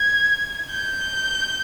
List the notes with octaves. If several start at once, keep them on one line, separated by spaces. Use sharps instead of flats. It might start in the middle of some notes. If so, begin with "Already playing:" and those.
Already playing: G#6
G6